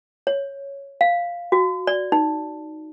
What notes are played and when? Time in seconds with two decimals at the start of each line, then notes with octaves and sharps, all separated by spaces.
0.27 C#5
1.01 F5
1.52 F#4
1.87 D5
2.12 D#4